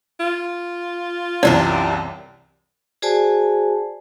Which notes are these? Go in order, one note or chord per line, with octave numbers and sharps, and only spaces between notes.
F4
C2 F#2 C3 E3 D4 G4 D5
F#4 G#4 C5 D5 G#5 A5